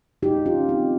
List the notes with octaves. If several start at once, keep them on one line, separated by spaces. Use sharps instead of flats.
D#3 G#3 D#4 G4
C#4 F4
C4 D#4